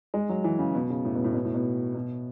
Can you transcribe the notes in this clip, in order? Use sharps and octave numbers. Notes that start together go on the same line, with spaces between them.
G#3
F#3
E3
C#3
B2
C#3
A2
B2
A2
B2
A2
B2
B2